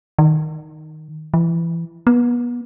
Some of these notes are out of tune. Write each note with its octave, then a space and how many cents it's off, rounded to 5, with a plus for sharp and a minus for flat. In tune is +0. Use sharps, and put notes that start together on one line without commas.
D#3 +0
E3 +25
B3 -30